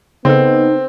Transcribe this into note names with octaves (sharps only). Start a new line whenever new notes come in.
C#3 B3 C4 D#4 A4